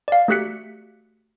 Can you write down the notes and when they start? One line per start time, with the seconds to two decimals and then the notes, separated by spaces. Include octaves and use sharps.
0.08 D5 F5
0.28 A3 F#4 G4 F#6 B6 C#7